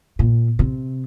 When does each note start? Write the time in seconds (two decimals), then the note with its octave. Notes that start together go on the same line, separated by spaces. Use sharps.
0.19 A#2
0.59 C3